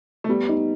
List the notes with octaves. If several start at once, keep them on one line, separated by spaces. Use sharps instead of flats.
A3
G3 B3
D#4